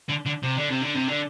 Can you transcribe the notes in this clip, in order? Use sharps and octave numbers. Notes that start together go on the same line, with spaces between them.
D3
D3
C3
D3
C3
D3
C3
D3